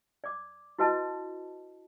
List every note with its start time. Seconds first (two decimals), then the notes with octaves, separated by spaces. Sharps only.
0.24 D5 D6
0.79 E4 F#4 B4 D#5 A5